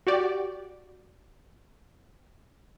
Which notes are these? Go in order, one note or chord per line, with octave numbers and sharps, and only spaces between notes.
F#4 G4 D5